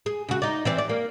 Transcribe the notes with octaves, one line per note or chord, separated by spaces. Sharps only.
G#4
C#3 F#4
D#4 D5
E3 C4 D5
D5
A#3